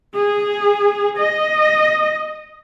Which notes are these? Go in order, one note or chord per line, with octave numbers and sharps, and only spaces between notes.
G#4
D#5